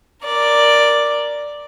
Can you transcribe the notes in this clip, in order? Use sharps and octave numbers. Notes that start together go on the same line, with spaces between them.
A#4 D5